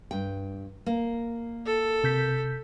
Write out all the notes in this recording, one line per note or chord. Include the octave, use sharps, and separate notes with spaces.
G2 G5
A#3
A4
C3 G6 B6